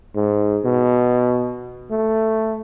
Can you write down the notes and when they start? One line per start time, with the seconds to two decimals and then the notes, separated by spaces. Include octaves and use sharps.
0.15 G#2
0.65 B2
1.91 A3